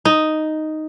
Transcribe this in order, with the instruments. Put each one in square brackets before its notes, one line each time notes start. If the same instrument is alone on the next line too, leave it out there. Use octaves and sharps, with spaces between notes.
[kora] D#4